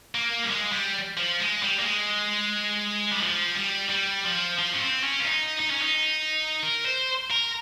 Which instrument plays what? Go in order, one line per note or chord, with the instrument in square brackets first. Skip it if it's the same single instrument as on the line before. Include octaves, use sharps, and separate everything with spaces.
[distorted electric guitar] A#3
G3
G#3
G3
F3
G#3
G3
A#3
G#3
G3
F3
G3
G3
F3
F3
C#4
C4
C#4
F4
D#4
D#4
C#4
D#4
A#4
C5
A#4